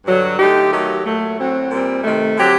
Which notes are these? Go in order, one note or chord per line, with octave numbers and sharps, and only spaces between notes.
G2 D3 F#3
D3 A3 D#4 G4
D#3 F#3 A3 D#4 G4
A#2 F#3 A3
A2 F#3 C4 F#4
A#2 G3 C4
C3 D#3 A3
D3 F#3 C4 G4